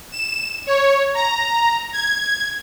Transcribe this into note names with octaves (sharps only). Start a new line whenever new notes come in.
E7
C#5
A#5
G#6